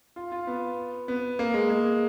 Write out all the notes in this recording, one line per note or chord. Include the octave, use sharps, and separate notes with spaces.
F4
F4
B3
B3
A#3
G#3
G#3